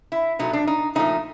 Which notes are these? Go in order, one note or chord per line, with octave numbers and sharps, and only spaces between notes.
E4
B2 F#3 A3 D#4
D4
D#4
A#2 F3 A3 D#4